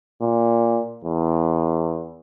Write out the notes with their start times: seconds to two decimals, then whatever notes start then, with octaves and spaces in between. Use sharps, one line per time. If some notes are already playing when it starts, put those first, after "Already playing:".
0.21 A#2
1.04 E2